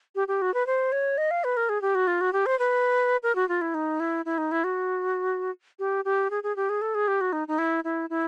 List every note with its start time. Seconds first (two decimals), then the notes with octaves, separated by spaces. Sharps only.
0.15 G4
0.28 G4
0.42 F#4
0.54 B4
0.67 C5
0.92 C#5
1.18 D#5
1.31 F5
1.44 B4
1.57 A#4
1.69 G#4
1.82 G4
1.95 F#4
2.07 F4
2.21 F#4
2.33 G4
2.46 C5
2.59 B4
3.23 A#4
3.35 F#4
3.49 F4
3.61 E4
3.74 D#4
4.00 E4
4.25 E4
4.38 D#4
4.52 E4
4.64 F#4
5.79 G4
6.05 G4
6.31 G#4
6.43 G#4
6.56 G4
6.69 G#4
6.82 A4
6.95 G#4
7.08 G4
7.21 F#4
7.33 D#4
7.48 D#4
7.58 E4
7.84 E4
8.10 E4